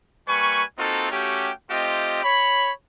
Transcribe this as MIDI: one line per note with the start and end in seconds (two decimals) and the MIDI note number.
0.28 0.63 55
0.28 0.63 58
0.28 0.63 71
0.28 0.63 80
0.28 0.63 85
0.78 1.11 58
0.78 1.11 60
0.78 1.11 63
0.78 1.11 65
0.78 1.11 66
0.78 1.11 69
1.12 1.51 57
1.12 1.51 61
1.12 1.51 66
1.12 1.51 67
1.71 2.20 57
1.71 2.20 60
1.71 2.20 65
1.71 2.20 67
1.71 2.20 75
2.24 2.71 73
2.24 2.71 83